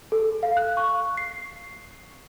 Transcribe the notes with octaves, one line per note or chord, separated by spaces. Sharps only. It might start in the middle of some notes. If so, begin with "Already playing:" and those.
A4
F5
F#6
C#6
C7